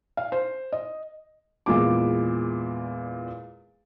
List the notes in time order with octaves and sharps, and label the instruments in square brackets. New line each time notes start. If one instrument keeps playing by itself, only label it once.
[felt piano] F5
C5
D#5
E2 A#2 G#3 D6